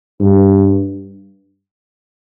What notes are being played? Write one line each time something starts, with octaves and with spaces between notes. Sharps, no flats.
G2